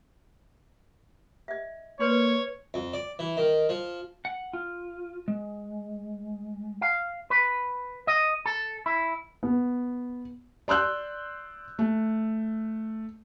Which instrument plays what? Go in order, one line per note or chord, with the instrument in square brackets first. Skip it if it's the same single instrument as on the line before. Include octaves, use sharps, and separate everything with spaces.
[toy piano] D#5 E5
[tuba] A#3 [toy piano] B4 D5 C6 [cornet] C#5
[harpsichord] F2
D5
E3
D#3
F3
[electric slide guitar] F#5
F4
G#3
[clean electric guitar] F5
B4
D#5
A4
E4
[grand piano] B3
[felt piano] D5 C6 E6 F#6 G6
A3